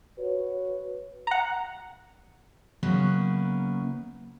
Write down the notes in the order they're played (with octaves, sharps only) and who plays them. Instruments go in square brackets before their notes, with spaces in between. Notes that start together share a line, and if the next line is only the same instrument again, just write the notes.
[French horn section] F#4 B4 C#5
[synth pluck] F#5 A#5
[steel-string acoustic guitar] C#3 F#3 A#3 B3 C#4 E4